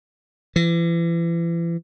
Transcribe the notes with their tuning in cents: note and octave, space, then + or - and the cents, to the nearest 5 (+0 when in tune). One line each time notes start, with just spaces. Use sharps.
E3 +35